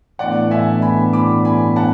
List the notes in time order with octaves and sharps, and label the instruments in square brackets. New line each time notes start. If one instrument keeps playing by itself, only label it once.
[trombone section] A2 E3 B3 D4 [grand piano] D5 F#5
[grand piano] E5 G#5
G#5 B5
B5 D6
G#5 B5
F#5 A5